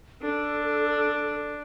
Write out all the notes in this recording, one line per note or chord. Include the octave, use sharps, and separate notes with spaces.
D4 A4